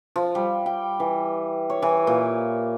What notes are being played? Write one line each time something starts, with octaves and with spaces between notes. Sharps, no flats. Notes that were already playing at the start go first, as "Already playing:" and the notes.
F3
G3
G5
E3
C#5
E3
A#2